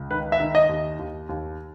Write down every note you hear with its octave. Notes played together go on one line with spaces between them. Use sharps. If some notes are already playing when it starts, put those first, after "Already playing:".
Already playing: C#2
D#3 B4
E5
D#3
D#5
D#2
D#2
D#2